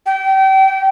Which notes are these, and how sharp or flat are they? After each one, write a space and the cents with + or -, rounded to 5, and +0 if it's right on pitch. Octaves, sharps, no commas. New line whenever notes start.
G5 -30